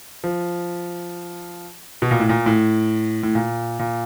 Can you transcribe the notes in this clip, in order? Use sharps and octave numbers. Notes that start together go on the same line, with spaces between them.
F3
B2
A#2
A2
A#2
A2
A2
A#2
A#2